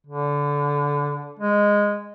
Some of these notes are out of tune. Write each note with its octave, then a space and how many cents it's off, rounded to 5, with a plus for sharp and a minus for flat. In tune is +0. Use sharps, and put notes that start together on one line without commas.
D3 -20
G#3 -10